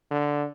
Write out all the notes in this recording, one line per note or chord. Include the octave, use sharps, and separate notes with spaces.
D3